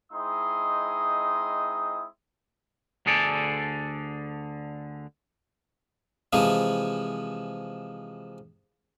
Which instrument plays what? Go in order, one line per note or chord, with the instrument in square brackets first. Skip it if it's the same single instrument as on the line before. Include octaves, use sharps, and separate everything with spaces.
[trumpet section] G#3 C4 D#4 E4 C6 D#6
[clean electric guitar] D2 D3 G#4 A4 D5
[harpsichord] C3 E3 F3 G#3